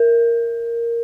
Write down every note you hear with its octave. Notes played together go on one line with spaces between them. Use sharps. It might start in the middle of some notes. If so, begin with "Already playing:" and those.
Already playing: A#4